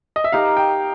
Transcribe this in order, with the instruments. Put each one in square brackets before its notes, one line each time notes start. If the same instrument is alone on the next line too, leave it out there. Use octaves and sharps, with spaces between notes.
[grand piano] D#5
E5
[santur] D#4 G4 A#4 [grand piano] F5
[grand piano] G5